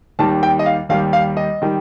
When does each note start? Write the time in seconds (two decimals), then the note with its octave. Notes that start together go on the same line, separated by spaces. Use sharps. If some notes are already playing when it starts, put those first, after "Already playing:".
0.19 D#2 D#3 G3 A5
0.43 G5
0.59 D#5
0.66 F5
0.89 D#2 D#3 G3 F5
1.13 F5
1.37 D#5
1.62 D#3 G3